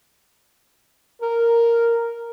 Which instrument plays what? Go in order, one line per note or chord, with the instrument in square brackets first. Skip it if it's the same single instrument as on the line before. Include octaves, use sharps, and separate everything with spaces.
[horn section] A#4